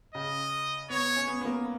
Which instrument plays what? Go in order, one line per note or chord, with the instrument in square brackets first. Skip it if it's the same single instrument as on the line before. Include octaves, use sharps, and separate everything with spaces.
[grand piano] C#3 [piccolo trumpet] D#5
[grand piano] B3 [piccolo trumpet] C#5
[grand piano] C#4
B3
B3
A#3